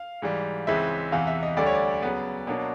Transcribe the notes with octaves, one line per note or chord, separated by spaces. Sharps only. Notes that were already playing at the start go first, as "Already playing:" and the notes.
Already playing: F5
G#2 E3 G3
C#2 C#3 E3 G#3 C4 E5
E2 C3 E3 F5
E5
D#5
D2 D3 G3 D5
C#5
D5
C#3 F#3 B3
B2 F#3 A#3 D4